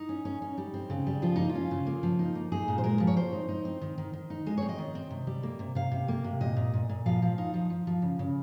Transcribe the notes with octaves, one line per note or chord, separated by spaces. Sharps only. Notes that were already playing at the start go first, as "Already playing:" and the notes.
Already playing: D#4
C#4
C#4
C#4
G3
C4
C#3
G3
F3 F4
A#3 D#4
F4
C#4
C#3
A#3
F3
D#4
A#3
D#4 G#4
A#2
C5
G#3 A#4
F3
C#5
C4 C5
D#4
D#4
C4
D#3
D#3
D#3
D#4
G#3 D#5
C4 C#5
D#5
D#3
C4
C3
G3
A#3
C3
C3 F5
C3
A#3
C3
A#2 D#5
A#2
A#2
A#2
F3 F5
F3
D#4
F3
F3
F3
C#3
C#3